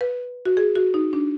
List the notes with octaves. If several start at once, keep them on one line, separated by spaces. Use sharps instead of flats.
B4
F#4
G#4
F#4
D#4
D4